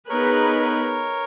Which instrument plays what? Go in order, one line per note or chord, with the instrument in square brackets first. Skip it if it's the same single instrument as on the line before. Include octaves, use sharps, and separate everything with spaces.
[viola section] B3 D#4 G#4 B4 [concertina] A#4 C#5